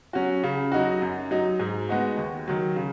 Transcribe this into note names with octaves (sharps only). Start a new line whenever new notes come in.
F#3 C#4 F#4
C#3
F#3 D#4 F#4
F#2
F#3 D#4
G#2
G#3 B3 D#4 F#4
D#2
D#3 F#3
C#3